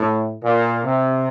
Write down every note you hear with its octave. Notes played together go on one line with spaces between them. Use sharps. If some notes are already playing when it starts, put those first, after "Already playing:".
Already playing: A2
A#2
C3